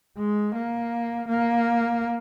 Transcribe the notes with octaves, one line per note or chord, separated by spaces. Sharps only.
G#3
A#3
A#3